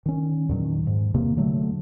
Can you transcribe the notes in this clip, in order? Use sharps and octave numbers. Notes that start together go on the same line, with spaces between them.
D#3 C#4
E2 A#2 D#3 F#3
G#2
E2 C3 D#3 A#3
D3 F#3 A3